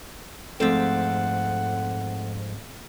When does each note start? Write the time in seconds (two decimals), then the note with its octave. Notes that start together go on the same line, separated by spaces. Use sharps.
0.60 F2 G#2 A3 C4 A4 F#5